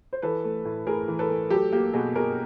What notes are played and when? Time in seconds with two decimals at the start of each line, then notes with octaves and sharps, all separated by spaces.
0.13 C5
0.22 E3 A4 B4
0.44 A3
0.65 A2
0.87 A2 G#4 A#4
1.08 E3
1.19 A4 B4
1.30 A3
1.50 F#3 G4 A4
1.72 A#3 G4
1.93 B2 F#4 G#4
2.15 B2 G#4 A#4